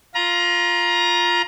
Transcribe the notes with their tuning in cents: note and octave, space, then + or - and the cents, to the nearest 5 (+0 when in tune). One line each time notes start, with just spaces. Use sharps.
F4 +0 A#5 +25